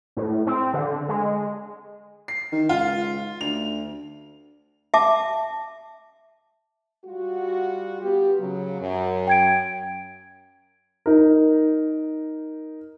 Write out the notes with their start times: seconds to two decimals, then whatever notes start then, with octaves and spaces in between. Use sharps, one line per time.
0.17 A2
0.47 C4
0.74 D3
1.09 G#3
2.28 C7
2.52 D#3
2.69 C#2 F4
3.41 D2 F7
4.94 E5 A5 D6
7.05 G3 F4 F#4
8.02 B3 F4 G4
8.40 C#3 F#3
8.81 F#2
9.27 G5 G#6 D7
11.06 D#4 A#4